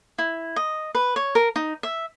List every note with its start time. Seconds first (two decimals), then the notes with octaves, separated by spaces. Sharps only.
0.18 E4
0.56 D#5
0.95 B4
1.16 C#5
1.35 A#4
1.56 D#4
1.83 E5